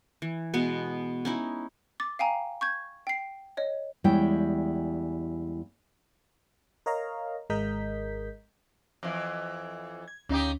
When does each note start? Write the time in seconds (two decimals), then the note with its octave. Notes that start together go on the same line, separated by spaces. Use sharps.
0.22 E3
0.54 B2 G#3 B3
1.25 C#4 D#4 E4
2.00 D6 A6
2.19 F5 G5 G#5 A#5
2.61 C#6 G6 G#6
3.07 G5 C7
3.57 C#5 D#5
4.04 E2 G3 G#3 E4 C#5 G5
6.86 A#4 C#5 D#5 F5 A#5
7.50 G#1 G#3 A#4 D#5 G6 B6
9.03 F2 E3
10.08 G#6
10.29 D2 C#3 C#4 D#4 G4